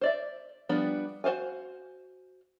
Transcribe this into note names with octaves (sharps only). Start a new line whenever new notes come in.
C5 D5 E5
F3 G3 B3 D4 B5
F#4 C5 F5 G#5